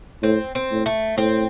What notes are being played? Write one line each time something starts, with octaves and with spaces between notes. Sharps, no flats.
A2 C4
C4
A2
A3
A2 C4